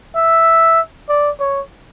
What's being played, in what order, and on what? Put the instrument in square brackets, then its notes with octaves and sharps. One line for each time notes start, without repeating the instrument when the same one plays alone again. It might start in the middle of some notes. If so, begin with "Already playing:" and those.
[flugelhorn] E5
D5
C#5